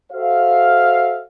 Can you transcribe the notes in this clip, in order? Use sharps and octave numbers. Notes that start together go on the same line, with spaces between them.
F#4 A4 C5 E5 F5